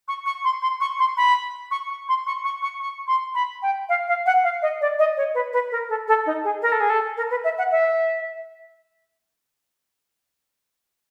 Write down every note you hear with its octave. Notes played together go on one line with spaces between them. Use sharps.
C#6
C#6
C6
C6
C#6
C6
B5
C#6
C#6
C6
C#6
C#6
C#6
C#6
C6
B5
G5
F5
F5
F#5
F5
D#5
D5
D#5
C#5
B4
B4
A#4
A4
A4
D#4
G#4
A#4
A4
G#4
A4
A#4
B4
E5
F#5
E5